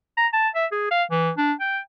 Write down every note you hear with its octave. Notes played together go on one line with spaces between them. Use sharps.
A#5
A5
E5
G#4
F5
E3
D4
G5